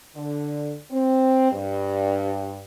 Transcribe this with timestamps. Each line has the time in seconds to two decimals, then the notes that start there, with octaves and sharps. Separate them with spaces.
0.15 D3
0.91 C4
1.52 G2